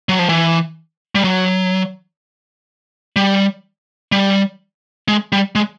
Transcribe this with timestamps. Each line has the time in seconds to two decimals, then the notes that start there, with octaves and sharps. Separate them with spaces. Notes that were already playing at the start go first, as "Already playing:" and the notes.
0.09 F#3
0.19 F3
0.29 E3
1.15 G3
1.24 F#3
3.16 G3
4.12 G3
5.08 G#3
5.32 G3
5.55 G#3